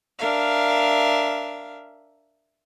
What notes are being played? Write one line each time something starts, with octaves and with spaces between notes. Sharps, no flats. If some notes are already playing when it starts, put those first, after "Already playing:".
D4 A#4 E5 F5